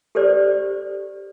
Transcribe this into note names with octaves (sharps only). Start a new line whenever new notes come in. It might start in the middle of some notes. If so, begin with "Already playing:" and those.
G4 A4 B4 C5 D5